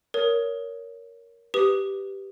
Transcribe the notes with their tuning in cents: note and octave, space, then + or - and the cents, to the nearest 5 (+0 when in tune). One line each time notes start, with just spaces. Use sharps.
A#4 +0 C#5 +15 D#6 +10
G4 -5 B4 +0 D#6 +0